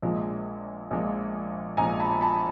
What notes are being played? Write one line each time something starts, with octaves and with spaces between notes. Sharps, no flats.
A#1 A#2 F3 G#3
A#1 A#2 F3 G#3
A#1 A#2 F3 G#3 G#5 A#5
A5 B5
A5 B5